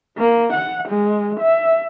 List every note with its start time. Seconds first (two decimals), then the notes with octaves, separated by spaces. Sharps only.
0.18 A#3
0.53 F#5
0.88 G#3
1.40 E5